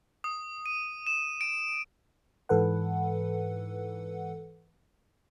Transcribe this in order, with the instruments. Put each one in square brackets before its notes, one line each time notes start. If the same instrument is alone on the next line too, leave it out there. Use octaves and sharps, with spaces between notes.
[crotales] D#6
D#7
E7
D7
[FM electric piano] G#2 E3 A4 B4 F#5